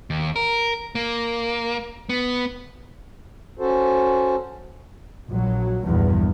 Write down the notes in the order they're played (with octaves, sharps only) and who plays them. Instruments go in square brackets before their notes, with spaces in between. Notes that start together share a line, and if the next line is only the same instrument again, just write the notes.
[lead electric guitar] D#2
A#4
A#3
B3
[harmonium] C#4 F#4 A4 C5
[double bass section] A#1 F#3
A#1 E2 G2